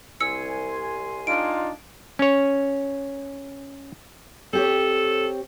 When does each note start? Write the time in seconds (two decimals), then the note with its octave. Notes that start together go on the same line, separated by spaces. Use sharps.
0.20 C2 G#5 C6 E6 C#7
1.27 D4 D#4 F4 D7
2.19 C#4 C#5
4.53 C4 G4 A4 C#5